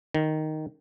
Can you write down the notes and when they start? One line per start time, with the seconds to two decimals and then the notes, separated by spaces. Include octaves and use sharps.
0.14 D#3